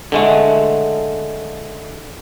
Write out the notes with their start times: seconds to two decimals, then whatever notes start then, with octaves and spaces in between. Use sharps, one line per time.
0.12 D3 G#3 A3